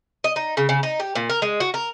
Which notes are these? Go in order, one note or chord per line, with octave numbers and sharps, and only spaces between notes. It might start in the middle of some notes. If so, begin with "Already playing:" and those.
D#5
D#4
C#3
C#3
D#4
G4
A#2
A#4
G#3
F#4
A#4